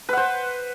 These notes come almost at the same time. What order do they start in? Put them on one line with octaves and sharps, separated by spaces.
B4 F#5 C5